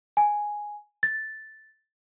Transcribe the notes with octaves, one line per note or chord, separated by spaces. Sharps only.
G#5
A6